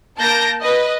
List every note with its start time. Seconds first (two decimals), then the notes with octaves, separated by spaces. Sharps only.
0.18 A#3 A5 G6 A#6 D7
0.60 B4 D#5